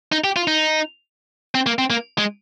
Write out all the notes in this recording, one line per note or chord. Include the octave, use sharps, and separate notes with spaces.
D#4
G4
F4
D#4
C4
A#3
C4
A#3
G#3